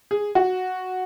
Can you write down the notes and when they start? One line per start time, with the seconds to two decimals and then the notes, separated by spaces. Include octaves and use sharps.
0.11 G#4
0.35 F#4